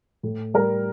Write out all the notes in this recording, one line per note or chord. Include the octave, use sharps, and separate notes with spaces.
A2
G3 A#4